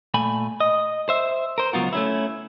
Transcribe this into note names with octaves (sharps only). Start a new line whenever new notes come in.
A#2 A3 G#5 B5
D#5
C5 E5
A#4 C5
C#2 F#3 B3 F4 F#4
A3 C#4 E4